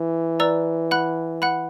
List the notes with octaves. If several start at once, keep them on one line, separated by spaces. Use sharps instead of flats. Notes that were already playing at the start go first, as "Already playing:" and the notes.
Already playing: E3
B4 D5 A#5 E6
F#5 B5 F#6
F#5 B5 F#6